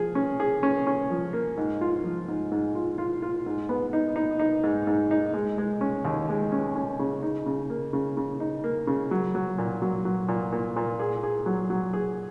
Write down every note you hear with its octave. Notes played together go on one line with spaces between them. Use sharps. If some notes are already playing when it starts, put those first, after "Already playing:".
Already playing: F3 G#4
C#4
G#4
C#4
C#4
F3
A#3
G#2
F4
F3
G#2
G#2
F4
F4
F4
G#2
B3
D#4
D#4
D#4
G#2
G#2
D#4
G#3
G#3
C#4
D#2
G#3
C#4
C#4
C#3
D#4
C#3
A#3
C#3
C#3
D#4
A#3
C#3
F#3
F#3
A#2
F#3
F#3
A#2
A#2
A#2
G#4
G#4
F#3
F#3
G#4